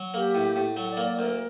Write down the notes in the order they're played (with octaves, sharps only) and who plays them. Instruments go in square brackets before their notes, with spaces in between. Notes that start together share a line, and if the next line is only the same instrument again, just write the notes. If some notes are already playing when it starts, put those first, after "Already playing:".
Already playing: [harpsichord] F#3
[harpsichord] A#3 [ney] A4
[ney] G4
[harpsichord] A2
A2
[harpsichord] F#3 [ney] A4
[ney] D5
[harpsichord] A#3
[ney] D5
[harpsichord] D2 [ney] A#4